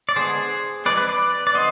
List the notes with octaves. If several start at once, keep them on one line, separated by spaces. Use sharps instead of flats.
D5
D3 G#3 B3 G#4 C5
F3 G#3 C4 B4 D5
B4 D5
B4 D5
D5
D3 F3 B3 C5 D#5